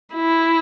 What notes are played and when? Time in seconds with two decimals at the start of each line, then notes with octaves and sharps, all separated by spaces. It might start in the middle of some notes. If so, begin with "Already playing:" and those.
0.14 E4